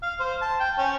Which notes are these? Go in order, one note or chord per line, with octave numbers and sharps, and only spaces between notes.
F5
C5
A5
G5
C#4